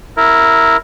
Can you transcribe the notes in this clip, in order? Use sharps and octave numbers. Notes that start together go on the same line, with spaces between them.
E4 A#4